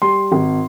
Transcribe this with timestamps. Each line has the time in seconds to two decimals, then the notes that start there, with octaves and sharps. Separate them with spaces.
0.02 G3 C6
0.32 G#1